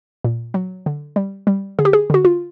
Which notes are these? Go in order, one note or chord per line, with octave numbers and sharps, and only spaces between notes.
A#2
F#3
D3
G3
G3
D3 G#4
G4
G#4
D3 F#4
F4